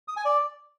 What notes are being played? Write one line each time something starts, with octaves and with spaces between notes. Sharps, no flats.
D#6
G#5
D5